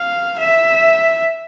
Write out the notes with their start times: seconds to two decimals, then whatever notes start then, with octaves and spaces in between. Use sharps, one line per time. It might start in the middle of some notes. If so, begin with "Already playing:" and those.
Already playing: F5
0.39 E5